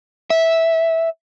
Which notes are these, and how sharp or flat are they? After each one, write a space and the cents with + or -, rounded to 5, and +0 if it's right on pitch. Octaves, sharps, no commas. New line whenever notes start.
E5 -10